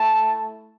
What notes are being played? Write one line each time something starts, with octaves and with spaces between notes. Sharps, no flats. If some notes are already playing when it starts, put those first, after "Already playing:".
Already playing: A3 E4 A5